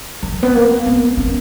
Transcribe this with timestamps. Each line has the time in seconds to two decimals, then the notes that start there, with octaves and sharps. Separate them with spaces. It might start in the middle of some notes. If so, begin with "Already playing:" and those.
0.23 F#3
0.43 B3
0.54 A#3
0.86 B3
1.17 C#4